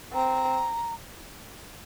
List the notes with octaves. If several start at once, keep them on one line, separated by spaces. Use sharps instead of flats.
C4 A#5